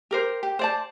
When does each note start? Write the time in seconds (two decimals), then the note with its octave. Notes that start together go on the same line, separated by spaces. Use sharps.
0.11 G4 A#4 C5
0.43 G4
0.59 C5 D5 A5